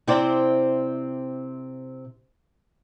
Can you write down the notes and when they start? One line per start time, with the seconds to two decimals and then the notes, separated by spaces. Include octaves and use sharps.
0.07 C3 C4 E4 C5 D5 E5